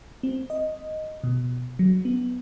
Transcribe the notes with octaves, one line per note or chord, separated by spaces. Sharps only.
C4
D#5
B2
F#3
B3